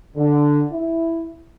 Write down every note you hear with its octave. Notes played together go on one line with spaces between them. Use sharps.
D3
E4